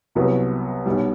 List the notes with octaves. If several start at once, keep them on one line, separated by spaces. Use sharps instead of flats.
C2 C3 F#3 B3 F#4
B1 B2 G3